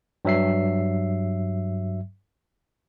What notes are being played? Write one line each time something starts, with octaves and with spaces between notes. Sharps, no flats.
G2 F#3 E5 C7